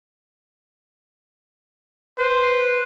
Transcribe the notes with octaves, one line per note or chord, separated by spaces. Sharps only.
B4 C5